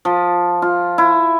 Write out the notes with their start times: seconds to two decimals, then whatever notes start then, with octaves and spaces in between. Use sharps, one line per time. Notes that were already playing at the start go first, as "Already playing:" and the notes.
0.05 F3
0.62 F4
0.98 E4